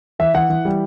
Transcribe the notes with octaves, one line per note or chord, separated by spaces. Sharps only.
E3 E5
E3 F#5
E3
G3